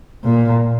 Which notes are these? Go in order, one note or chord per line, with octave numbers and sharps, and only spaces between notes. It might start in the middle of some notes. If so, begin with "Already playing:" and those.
A#2